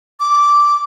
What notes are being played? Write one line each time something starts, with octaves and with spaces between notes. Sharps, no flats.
D6